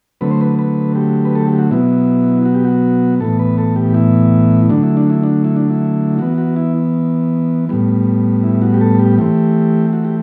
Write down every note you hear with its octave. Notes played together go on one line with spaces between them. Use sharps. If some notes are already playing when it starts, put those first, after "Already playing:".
D3 F#3 A3 C4 B4
C5
B4
B4
G4
B4
A4
G4
F#4
B2 F#3 B3 E4
F#4
G4
F#4
A2 E3 B3 A4
B4
A4
G4
E4
D3 F#3 A3 D4
E4
D4
E4
D4
E4
D4
E4
E3 B3 F#4
F#4
E4
A2 G3 B3
E4
F#4
G4
A4
G4
E3 A3 C4 G4
F#4
G4